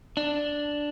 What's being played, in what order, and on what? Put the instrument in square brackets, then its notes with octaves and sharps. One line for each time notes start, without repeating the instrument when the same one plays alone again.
[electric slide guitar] D4